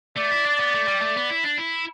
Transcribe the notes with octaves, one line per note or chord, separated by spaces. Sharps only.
A3 D5
E4
D4
B3
A3
G3
A3
B3
E4
D4
E4